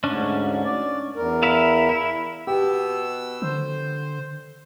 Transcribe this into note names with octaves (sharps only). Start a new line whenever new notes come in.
D2 G#2 C#4 D4
D5
E2 A#4
E4 E5 F5
E4
B2 B3 G4 E6
D3 C5